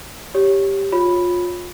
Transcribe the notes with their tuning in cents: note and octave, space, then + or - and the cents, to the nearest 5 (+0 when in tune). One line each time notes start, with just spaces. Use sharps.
G4 +0 C#5 +0
F4 +25 C#5 -10 B5 +0